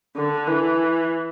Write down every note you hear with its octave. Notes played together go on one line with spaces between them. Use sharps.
D3
E3